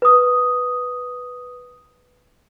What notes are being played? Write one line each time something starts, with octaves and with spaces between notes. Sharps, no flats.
B4 D#6